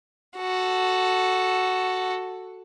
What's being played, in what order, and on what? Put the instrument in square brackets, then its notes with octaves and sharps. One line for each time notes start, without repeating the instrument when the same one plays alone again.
[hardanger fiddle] F#4 A4